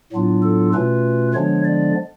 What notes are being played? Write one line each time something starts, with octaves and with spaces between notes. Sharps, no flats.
A2 F#3 B3 D4 F4
A4
B2 A3 C#4 F4 B4
D3 F3 G#3 B3 D4 C#5
D5